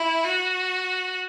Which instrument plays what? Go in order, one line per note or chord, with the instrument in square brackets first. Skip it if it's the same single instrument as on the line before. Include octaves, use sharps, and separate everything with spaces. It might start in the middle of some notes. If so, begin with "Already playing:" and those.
Already playing: [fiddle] E4
F#4